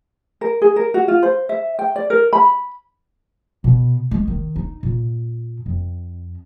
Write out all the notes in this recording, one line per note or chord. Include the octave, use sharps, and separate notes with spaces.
A#4
G#4
A#4
F#4
F4
C5
E5
G5
D5
A#4
B5
B2
G#3
D#3
D#4
A#2
F2